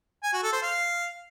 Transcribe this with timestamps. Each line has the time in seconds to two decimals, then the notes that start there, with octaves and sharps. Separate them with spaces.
0.23 G#5
0.33 F#4
0.43 A4
0.53 C5
0.63 F5